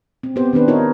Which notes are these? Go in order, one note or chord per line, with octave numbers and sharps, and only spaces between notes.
C4
B3 C4 G4 C5
D#3 B3 D4 B4
D#4 F4 A#4 C#5